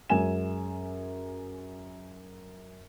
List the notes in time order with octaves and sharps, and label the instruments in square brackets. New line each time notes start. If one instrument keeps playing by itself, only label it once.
[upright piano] F#2 G#3 G#5 E7